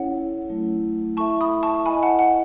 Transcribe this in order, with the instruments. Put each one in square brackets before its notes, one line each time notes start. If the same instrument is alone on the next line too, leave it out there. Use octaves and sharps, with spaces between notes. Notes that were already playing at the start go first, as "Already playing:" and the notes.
Already playing: [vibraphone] C#4 E4 A4 C#5 [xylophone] F#5
[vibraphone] F#3 A3 E4
[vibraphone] E4 A4 E5 [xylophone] A5 C#6
[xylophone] B5 D#6
A5 C#6
[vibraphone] E4 A4 D#5 [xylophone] G#5 B5
[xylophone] F#5 A5
F#5